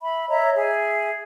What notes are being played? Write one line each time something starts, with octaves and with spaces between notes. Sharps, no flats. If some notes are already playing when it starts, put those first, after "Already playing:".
E5 B5
C#5 D#5 E5 A#5
G#4 E5 G#5